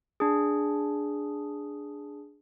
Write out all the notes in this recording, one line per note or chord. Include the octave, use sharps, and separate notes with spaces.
D4 G#4